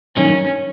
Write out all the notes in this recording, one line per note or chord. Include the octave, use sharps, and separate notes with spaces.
G2 D#3 F#3 A#3 C#4 D#4